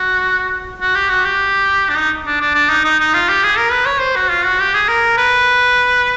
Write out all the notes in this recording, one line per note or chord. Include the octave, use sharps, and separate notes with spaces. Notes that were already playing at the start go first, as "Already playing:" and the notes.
Already playing: F#4
F#4
G4
F#4
G4
D4
D#4
D4
D4
D4
D#4
D#4
D#4
F4
G4
G#4
A#4
B4
C#5
C5
F#4
F4
F#4
G4
G#4
A#4
B4